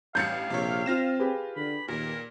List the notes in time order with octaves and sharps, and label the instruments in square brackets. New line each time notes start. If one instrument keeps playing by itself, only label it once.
[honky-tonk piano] A1 G2 [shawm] F5 [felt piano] G6 A6 C#7
[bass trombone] A#1 [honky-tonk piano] C3 C#5
[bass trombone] C4 [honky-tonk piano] F4 A#6 E7
[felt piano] G4 G#4 B4
[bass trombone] D3 [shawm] B5
[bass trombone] D#2 [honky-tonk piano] A#2 [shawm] A#4